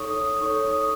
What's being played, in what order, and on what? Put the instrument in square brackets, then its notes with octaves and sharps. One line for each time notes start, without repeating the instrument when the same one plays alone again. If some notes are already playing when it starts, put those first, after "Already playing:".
Already playing: [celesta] D#4 A4 C#5 C#6 D#6
D#6
D#4 A4 C#5 C#6
D#6